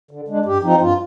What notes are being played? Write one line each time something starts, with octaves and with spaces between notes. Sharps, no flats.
D3
G#3 D4
G2 G4
F3 C4 D#4
G2 F4